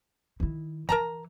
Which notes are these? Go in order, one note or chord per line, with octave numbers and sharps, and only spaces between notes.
D#3 E4
E3 A#4 A5 A#5